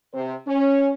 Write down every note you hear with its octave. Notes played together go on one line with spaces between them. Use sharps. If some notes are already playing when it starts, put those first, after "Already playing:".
C3 C5
C#4